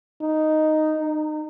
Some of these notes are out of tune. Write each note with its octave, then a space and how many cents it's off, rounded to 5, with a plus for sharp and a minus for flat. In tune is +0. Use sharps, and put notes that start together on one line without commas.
D#4 -5
D#4 -30